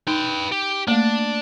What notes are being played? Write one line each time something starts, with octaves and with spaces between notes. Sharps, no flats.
D#4 B4 G5
G4
A3 A#3 D4